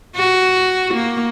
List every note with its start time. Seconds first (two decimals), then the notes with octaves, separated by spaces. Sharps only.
0.15 F#4
0.94 A#3